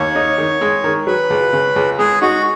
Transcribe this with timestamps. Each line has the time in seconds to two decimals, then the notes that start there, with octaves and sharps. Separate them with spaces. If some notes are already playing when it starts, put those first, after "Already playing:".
Already playing: D#2 C#5
0.15 D#4
0.38 D#3
0.61 G#3
0.84 D#3
1.07 F#3 B4
1.30 C#2
1.53 C#3
1.76 C#2
1.99 G#3 G#4
2.22 D#4 F#4